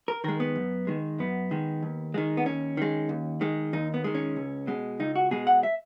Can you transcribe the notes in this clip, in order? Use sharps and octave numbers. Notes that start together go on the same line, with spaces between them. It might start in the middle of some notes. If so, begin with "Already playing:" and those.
A#4
D#3 G#3 A#4
B3
F#2
D#3 G#3
F#2 B3
D#3 G#3
D#2
D#3 G#3
B3
D#2 C#4
D#3 G#3
D#2
D#3 G#3
D#2 D#4
B3
D#3 G#3
C#4
C#2
B2 G#3
C#2 D#4
F#4
B2 G#3 G#4
F#5
E5